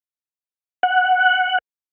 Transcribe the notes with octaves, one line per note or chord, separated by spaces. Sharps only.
F#5